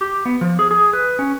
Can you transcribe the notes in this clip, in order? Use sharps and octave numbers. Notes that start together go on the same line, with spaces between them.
G4
B3
F3
G#4
G#4
B4
C#4